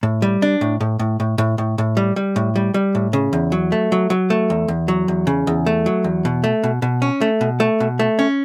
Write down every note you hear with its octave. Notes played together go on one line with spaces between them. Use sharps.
A2
G3
D4
A2
A2
A2
A2
A2
A2
A2
G3
G3
A2
G3
G3
A2
C#3
E2
F#3
A3
F#3
F#3
A3
E2
E2
F#3
E2
C#3
E2
A3
F#3
E2
B2
A3
B2
B2
C#4
A3
B2
A3
B2
A3
C#4